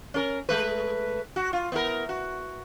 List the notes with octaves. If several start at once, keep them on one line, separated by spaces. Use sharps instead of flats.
C#4 A#4
G#3 A3 B4
F#4
F4
B3 E4 A#4
F#4